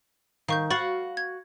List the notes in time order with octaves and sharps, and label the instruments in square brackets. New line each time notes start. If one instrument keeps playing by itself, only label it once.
[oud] D#3 [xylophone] F5 C#6 G6
[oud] F#4 F5 [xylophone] B5 C#6 A6
[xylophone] G#6